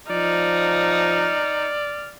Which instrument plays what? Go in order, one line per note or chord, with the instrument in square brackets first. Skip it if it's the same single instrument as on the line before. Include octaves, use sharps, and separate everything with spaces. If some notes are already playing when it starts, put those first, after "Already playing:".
[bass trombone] F3 [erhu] D#4 [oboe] D5 [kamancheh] F6